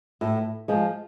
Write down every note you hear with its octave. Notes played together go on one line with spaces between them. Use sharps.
A2
F3 G#3